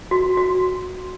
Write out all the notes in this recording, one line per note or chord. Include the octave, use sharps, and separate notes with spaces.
F#4
F#4